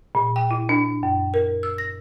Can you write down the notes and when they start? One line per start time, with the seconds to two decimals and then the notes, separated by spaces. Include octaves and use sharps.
0.15 A#2
0.36 G5
0.51 E4
0.69 D4
1.03 F#2
1.34 A#4
1.63 E6
1.78 A#6